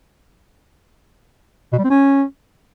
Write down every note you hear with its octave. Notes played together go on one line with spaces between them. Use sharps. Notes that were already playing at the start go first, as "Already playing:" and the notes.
B2
G3
C4
C#4